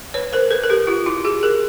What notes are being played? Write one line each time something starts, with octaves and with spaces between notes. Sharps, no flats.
B4 C#5
A#4 C5
A4 B4
A#4
G4 A4
F4 G4
E4 F#4
F#4 G#4
G#4 A#4